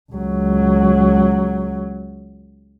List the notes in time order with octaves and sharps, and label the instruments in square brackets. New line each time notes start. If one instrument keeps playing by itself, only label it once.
[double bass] C#2 F#3